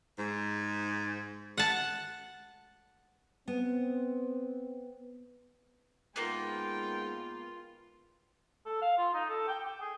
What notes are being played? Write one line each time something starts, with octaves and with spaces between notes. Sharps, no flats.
G#2
F#5 A5
B3 C4
G#2 G#3 A#3 B3 F4 G5
A4
F5
F4
D#4
A4
G5
G5
G#4